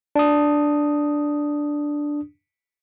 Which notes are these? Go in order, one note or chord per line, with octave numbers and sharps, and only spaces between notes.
D4 D#6